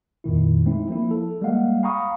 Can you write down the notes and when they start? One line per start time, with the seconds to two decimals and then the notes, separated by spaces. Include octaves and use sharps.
0.24 F2 A#2 D#3 E4
0.65 G#3 A3 C4 D#4 E4
0.89 F3 A#3 E4
1.11 A4
1.41 G3 G#3 A#3 D#5 F5 F#5
1.83 F5 G5 A#5 B5 C#6 D#6